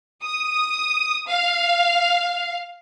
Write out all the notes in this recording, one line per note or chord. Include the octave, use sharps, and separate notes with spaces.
D#6
F5